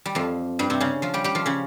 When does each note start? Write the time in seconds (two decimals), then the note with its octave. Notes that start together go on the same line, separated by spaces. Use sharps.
0.06 G3
0.15 F2 F3
0.59 G2 G3
0.70 C3 C4
0.80 C#3 C#4
1.02 F3 F4
1.14 G3 G4
1.24 G3 G4
1.35 F3 F4
1.46 C#3 C#4